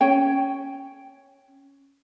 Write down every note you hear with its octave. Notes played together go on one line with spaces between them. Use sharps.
C#4 C#5 G5